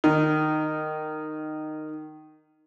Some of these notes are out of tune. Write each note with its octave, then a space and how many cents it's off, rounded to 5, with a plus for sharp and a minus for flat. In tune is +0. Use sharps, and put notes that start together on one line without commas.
D#3 -10